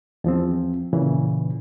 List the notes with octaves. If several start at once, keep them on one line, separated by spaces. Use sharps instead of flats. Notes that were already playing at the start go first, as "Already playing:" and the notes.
E2 F3 C4
A#2 C#3 E3